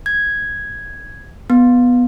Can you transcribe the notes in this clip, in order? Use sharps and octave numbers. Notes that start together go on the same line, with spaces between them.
G#6
B3